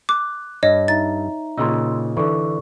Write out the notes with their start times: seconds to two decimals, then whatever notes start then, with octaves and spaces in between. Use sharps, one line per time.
0.09 D6 F#6
0.63 G2 C#5 D#5
0.88 D#4 E5 A#5 A6
1.58 A#2 C#3 D#4 C6 E6
2.17 D3 E3 A4 D5 C#6